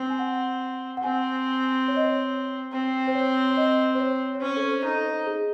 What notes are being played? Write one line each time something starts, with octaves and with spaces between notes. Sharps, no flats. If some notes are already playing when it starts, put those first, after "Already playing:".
Already playing: C4
G#5
F#5
F#5
C4 G#5
C#5
D#5
C#5
C4
C5
C#5
C#5
D#5
C5
C#5
C#5
C#4 C5
A4
C5
D#4 A4
C5
G#4